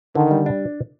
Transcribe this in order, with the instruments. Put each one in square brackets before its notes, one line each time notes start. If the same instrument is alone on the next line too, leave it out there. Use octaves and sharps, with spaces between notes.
[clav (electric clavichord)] D3 [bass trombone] D#3
[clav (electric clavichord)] G3
D4